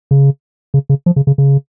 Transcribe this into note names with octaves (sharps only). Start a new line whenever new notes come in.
C#3
C#3
C#3
F3
C#3
C#3
C#3